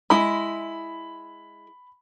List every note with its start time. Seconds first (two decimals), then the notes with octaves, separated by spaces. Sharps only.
0.10 G#3 E4 B5